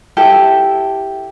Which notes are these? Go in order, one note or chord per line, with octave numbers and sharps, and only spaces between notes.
E4 G4 A4 A5